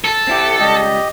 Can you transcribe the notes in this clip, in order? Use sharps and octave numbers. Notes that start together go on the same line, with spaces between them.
A4
C4 E4 G4
C#2 G3 G4 D#5